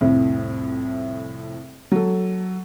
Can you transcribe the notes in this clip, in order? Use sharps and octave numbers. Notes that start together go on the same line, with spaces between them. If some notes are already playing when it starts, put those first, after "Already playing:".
C2 F2 A2
F#3 A4